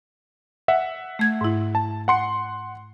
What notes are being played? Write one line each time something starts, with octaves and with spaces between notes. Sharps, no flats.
E5 F#5
A3 G#6
G#2 E4
A5
F#5 C6 C#7